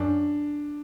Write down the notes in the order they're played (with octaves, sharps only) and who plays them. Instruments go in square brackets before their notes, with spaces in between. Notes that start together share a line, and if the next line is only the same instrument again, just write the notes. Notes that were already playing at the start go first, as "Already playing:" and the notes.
Already playing: [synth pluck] F#2 [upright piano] D4